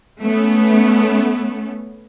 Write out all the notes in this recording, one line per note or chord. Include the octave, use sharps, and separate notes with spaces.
A3 B3 C#4